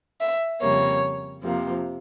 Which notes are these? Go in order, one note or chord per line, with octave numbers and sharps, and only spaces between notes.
E5
F2 C#3 G3 A#3 C#5
F2 C3 F3 A#3